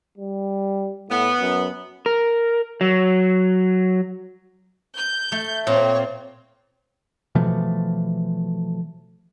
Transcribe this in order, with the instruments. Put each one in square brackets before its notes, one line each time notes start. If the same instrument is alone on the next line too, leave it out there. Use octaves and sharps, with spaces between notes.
[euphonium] G3
[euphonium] A2 [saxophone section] B3
[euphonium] F#2
[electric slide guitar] A#4
F#3
[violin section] G6
[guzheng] A3
[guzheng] A#2 [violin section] C4 [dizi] C#5
[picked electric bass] B2 E3 F3 A3